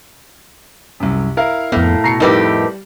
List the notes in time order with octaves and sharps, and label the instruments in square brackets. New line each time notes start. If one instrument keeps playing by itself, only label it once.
[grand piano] C2 F#2
E4 A#4 F5
[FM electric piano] F2 B3 [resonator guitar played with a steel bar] A2
[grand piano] B2 C7 C#7 [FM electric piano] A#5
[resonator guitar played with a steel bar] F2 A2 G4 [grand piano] G3 [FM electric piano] D#4 A#4 B4